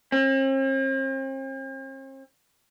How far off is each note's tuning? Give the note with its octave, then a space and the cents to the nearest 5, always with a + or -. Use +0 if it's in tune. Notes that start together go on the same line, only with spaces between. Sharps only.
C4 +45